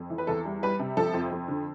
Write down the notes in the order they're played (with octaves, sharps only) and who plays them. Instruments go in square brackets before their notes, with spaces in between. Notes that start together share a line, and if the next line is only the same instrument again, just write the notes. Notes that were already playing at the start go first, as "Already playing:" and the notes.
Already playing: [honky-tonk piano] F2
E3
B4
E2 A4
G3
G3 B4
C3
F3 A4
F2
F2
D3